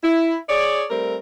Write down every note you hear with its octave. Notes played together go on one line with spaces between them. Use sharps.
E4
G#4 C#5 D5
G3 A3 C4 A#4